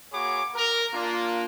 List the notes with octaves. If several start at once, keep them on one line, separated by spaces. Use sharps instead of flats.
A#3 F#4 G#4 C#5 B5 D6
A#4
A#3 D4 F4